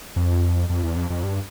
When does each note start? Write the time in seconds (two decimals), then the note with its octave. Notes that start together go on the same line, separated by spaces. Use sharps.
0.16 F2
0.70 F2
0.83 E2
0.96 F2
1.10 F2
1.23 G2